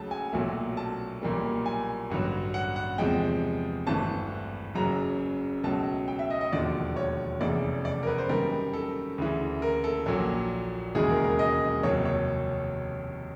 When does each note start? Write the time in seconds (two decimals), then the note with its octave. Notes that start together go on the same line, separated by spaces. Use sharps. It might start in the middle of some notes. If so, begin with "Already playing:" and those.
Already playing: C#2 C#3 F#3 A3 A5
0.11 G#5
0.33 B1 A#2 F#3 A3
0.77 A5
1.22 B1 A#2 G3 A#3
1.66 G#5
2.10 A1 G2 D3 F#3
2.54 F#5
2.76 F#5
2.98 E2 C3 F3 G#3 G5
3.87 G#1 G2 E3 A3 A5
4.75 F#1 F#2 C#3 F#3 A#5
5.63 C#2 B2 F#3 A3 A5
6.08 G5
6.19 E5
6.30 D#5
6.41 D#5
6.52 E1 D#2 D3 F3 D5
6.96 C#5
7.41 F1 E2 C#3 E3 A3 D5
7.85 D5
8.03 A#4
8.07 B4
8.18 C5
8.29 F#2 D#3 G3 A#4
8.74 A4
9.18 D2 C#3 E3
9.62 A#4
9.84 A4
10.06 A#1 A#2 F#3 A4
10.95 E1 D#2 C#3 E3 G#3 G#4
11.10 A#4
11.24 A#4
11.39 D#5
11.83 F1 D#2 D#3 F#3 C#5
12.05 C#5